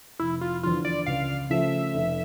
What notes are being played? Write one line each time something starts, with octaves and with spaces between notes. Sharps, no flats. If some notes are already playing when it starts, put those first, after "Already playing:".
F1 E4
F4
E2 D3 F3 F4
D5
C#2 F5
C#3 F3 A3 E5
F1